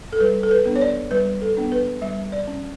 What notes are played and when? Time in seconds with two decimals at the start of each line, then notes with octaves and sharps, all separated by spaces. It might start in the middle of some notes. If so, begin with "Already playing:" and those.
0.13 A4
0.20 G3 B4
0.43 A4
0.51 B4
0.66 B3 D4
0.76 C#5
0.81 D5
1.11 G3 B4
1.41 A4
1.57 B3 D4
1.72 B4
2.02 G3 E5
2.32 D5
2.47 C#4